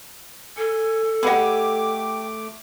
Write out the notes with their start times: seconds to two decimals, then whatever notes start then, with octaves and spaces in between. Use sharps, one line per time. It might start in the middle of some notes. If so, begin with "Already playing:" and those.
0.57 A4 G#5
1.23 A3 G4 G#4 D#5 F#5 B5 D6